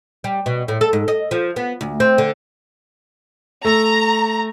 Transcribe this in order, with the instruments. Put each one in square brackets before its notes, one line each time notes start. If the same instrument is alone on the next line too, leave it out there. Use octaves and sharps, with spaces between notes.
[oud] G3
B2
A2
A4
G#2
D#5
F3
B3
D2
C4
D3
[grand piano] A3 A4 [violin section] A#5